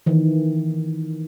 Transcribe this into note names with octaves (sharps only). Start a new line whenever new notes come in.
D#3 E3